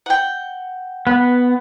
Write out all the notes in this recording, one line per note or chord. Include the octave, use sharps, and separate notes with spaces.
F#5 G5
B3